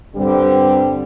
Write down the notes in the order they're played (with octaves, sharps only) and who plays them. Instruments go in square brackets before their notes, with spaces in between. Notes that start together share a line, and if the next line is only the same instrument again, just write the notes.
[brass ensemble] G2 D3 G3 C4